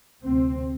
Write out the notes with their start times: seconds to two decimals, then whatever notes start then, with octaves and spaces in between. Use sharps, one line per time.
0.23 D2 C3 C4